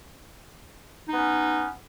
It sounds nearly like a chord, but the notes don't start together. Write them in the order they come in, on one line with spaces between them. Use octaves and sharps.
D#4 B3 C#4